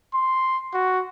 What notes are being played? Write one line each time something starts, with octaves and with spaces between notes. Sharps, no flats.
C6
F#4